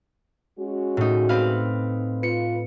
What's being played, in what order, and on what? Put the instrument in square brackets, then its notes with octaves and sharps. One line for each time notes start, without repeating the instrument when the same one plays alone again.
[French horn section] G#3 C#4 F#4
[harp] A2 D#4
C4 B4 F5
[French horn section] F4 B4 [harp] C#7